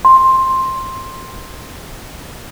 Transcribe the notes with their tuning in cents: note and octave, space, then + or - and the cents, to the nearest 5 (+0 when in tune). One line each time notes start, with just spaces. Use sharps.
C6 +10